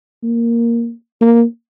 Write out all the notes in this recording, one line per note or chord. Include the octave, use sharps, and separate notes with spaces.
A#3
A#3